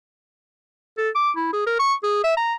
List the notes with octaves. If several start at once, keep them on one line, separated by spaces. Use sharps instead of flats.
A4
D6
E4
G#4
A#4
C#6
G#4
E5
A#5